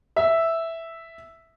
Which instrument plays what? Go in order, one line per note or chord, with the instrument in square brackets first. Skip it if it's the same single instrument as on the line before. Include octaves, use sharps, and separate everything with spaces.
[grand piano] E5 E6